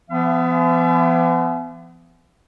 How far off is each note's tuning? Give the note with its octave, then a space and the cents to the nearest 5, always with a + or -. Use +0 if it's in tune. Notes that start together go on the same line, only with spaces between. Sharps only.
F3 -45 B3 +25 E5 +45